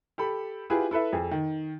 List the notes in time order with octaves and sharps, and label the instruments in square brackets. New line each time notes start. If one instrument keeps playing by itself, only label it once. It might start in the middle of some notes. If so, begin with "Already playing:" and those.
[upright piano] G4 A4 B5
E4 F4 G4 G#4 B4
E4 A4 B4 E5
F2 G#4
D#3